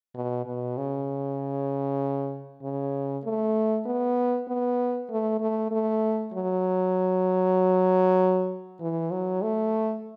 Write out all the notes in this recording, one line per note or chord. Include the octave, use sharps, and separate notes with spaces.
B2
B2
C#3
C#3
A3
B3
B3
A3
A3
A3
F#3
E3
F#3
A3